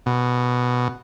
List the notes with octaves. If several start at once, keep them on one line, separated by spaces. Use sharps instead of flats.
B2